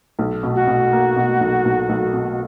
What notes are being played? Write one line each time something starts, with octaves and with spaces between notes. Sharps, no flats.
B1
B2
F#4
B2
A#3
B2
B1
B1
B1
B2